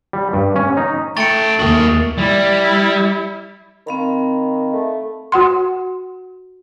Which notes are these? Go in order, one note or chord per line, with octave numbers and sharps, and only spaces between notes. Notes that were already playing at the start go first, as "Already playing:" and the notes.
G3
G2
C#4
D#4
A3 C#4 G5 A6 C#7
D#2 A#3 F#4 G#4
G3 E4
D#3 C4 F5 B5
A3
F#4 F#5 C6